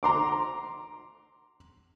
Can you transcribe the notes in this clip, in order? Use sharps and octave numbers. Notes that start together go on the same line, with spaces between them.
A#5 C6 D6